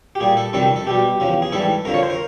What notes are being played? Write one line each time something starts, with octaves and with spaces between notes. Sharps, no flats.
G4
A#2 G3 G#4
A4
F2 C3 D#3 G3 A4
A4
B2 G3 G4
E2 C#3 F3
G#4
G#2 E3 G3 A4
F2 D3 F3 A#4
C#5
C5
A#4